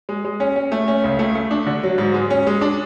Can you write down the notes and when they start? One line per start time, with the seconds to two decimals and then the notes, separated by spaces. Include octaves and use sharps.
0.09 G#3
0.25 G#3
0.40 C#4
0.56 C#4
0.72 A3
0.88 C#4
1.04 C#2
1.19 A3
1.35 A3
1.51 D4
1.67 D3
1.83 F#3
1.98 G#2
2.14 G#3
2.30 C#4
2.47 G#3
2.61 D4